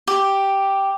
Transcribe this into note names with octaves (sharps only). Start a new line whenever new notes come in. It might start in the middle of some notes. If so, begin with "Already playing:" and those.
G4